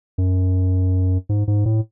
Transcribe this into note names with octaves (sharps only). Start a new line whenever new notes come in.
F#2
G#2
G#2
A2